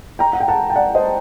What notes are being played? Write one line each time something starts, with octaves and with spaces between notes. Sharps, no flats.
G5 A#5
F#5
G5
F#5 A5
G5
D5 F#5
C5 D#5